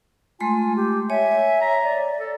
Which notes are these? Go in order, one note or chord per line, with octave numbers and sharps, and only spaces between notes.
G#3 A3 F4 G#5 C6
G4
C#5 E5 G#5
A#5
D5
A4